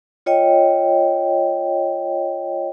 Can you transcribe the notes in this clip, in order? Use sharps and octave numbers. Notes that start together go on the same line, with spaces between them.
F4 C#5 D#5 G5